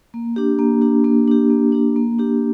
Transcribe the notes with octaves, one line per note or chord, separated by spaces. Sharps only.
A#3
D4 G4
A#3
D4 G4
A#3
D4 G4
A#3
D4 G4
A#3
D4 G4